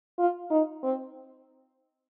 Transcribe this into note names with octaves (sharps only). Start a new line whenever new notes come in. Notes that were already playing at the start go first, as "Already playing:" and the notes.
F4
D#4
C4